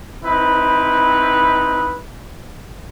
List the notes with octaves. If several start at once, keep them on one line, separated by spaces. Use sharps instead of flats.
C4 D#4 E4 B4